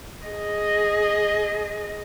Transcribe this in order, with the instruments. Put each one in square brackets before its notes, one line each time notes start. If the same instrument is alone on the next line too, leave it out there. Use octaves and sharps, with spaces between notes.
[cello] G#4 D#5